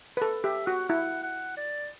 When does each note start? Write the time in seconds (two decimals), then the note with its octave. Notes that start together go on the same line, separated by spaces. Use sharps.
0.17 B4
0.22 A4
0.44 G4 E5
0.66 F#4 F#5
0.89 E4 F#5
1.23 F#5
1.57 D5